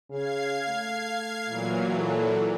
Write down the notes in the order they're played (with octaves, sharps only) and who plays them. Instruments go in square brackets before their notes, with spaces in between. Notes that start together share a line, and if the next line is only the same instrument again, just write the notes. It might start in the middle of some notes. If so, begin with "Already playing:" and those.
[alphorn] C#3 [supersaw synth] F5 G#6 C7
[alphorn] A3
[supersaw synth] A#2 E3 F#3
[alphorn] A4